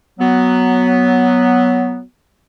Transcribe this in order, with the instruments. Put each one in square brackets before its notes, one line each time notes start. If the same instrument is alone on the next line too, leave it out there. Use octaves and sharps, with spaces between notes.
[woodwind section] F#3 B3